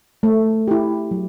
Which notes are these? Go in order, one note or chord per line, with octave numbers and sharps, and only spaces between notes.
A3
E4 G4
F#3